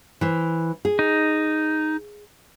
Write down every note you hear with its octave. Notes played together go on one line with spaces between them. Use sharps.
E3 C5
G#4
D#4